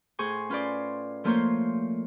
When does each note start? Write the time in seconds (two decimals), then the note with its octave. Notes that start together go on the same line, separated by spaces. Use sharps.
0.19 A2 G#4 C5 G#5 C#6
0.49 C#4 F4 B4 C5 D5
1.24 F3 A3 A#3 F4 C5 C#5